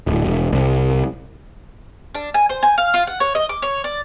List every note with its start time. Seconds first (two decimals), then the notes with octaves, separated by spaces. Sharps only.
0.07 D1
0.25 E1
0.52 C2
2.15 D4
2.34 G#5
2.49 C5
2.63 G#5
2.78 F5
2.94 F4
3.07 F#5
3.20 C#5
3.35 D#5
3.49 D6
3.62 C#5
3.84 D5